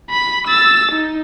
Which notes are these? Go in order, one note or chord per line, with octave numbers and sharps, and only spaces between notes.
B5
E6 A6
D#4